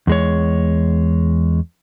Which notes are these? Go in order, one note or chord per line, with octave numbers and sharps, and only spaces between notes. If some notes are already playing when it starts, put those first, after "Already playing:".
E2 G#3 C#5